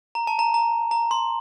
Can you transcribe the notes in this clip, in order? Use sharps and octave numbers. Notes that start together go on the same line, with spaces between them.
A#5
A5
A#5
A#5
A#5
C6